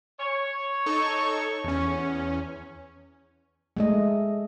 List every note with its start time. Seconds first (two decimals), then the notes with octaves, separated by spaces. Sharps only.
0.19 C#5
0.86 D#4 A4 C#6
1.64 E2 C#4
3.77 G#3 A3 D#5